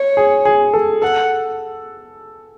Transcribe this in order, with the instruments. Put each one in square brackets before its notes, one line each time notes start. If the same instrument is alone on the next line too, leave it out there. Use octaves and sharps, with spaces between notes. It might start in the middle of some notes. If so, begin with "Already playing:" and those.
Already playing: [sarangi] C#5
[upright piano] G#4
G#4
A4
[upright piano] A4 [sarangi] F#5